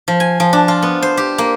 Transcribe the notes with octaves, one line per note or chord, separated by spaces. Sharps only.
F3
G#5
F3
D4
F4
B3
C5
G4
A#3